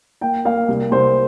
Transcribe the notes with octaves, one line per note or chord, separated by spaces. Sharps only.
A#3 G5
A#3 F5
C2
C2 C5